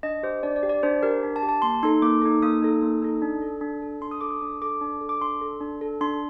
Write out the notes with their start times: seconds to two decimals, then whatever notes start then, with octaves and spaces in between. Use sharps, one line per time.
0.03 D4 D#5
0.23 G4 C5
0.43 D4 D5
0.56 D5
0.63 G4
0.69 D5
0.83 D4 C5
1.03 G4 A#4
1.23 D4
1.36 A5
1.43 G4
1.49 A5
1.62 A#3 C6
1.83 D#4 A4 C6
2.02 A#3 D6
2.22 D#4 A4
2.42 A#3 D#6
2.62 D#4 A4
2.82 A#3
3.02 D#4 A4
3.22 D4
3.42 A4
3.61 D4
3.82 A4
4.01 D4 C6
4.11 D#6
4.21 A4 D6
4.31 D#6
4.41 D4 D#6
4.62 A4 D6
4.81 D4
5.01 A4
5.09 D6
5.21 D4 C6
5.41 A4
5.61 D4
5.81 A4
6.01 D4 C6